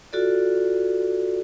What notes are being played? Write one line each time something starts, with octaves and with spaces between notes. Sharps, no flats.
F4 F#4 A4 D5